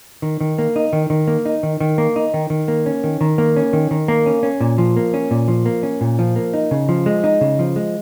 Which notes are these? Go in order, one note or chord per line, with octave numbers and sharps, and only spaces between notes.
D#3
D#3
A#3
D#4
D#3
D#3
A#3
D#4
D#3
D#3
A#3
D#4
D#3
D#3
A#3
C#4
D#3
D#3
A#3
C#4
D#3
D#3
A#3
C#4
C#4
A#2
F3
A#3
C#4
A#2
F3
A#3
C#4
A#2
F3
A#3
D#4
C#3
F3
G#3
D#4
C#3
F3
G#3